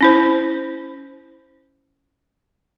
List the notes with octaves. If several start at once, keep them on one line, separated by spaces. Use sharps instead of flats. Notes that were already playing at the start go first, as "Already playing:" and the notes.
C#4 E4 C5